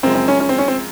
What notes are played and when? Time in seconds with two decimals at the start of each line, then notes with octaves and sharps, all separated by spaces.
0.03 F#2 C#3 F3 G#3 C4
0.15 C4
0.28 C#4
0.40 C#4
0.49 C4
0.58 C#4
0.68 C4